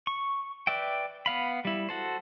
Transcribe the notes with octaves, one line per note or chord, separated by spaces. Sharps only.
C#6
B4 D5 E5 G5
B3 F5 B5
G3 E4
F#4 A4 C5